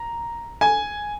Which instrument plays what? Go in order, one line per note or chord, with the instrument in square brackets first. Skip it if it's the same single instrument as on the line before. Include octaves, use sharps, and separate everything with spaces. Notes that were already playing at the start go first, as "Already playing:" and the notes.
Already playing: [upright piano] A#5
G#5